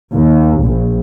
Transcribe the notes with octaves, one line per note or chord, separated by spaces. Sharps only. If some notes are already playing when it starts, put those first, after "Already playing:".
D#2
A#1